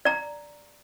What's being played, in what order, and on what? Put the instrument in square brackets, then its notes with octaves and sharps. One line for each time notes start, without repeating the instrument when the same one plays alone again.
[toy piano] D5 A#5